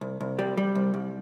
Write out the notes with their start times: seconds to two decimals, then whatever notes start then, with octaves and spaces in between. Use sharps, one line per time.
0.01 C2
0.21 C2
0.39 G3
0.57 G3
0.75 C2
0.94 C2